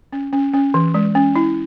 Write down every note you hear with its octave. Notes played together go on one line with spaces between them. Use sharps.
C#4
C#4
C#4
E3
G#3
C#4
E4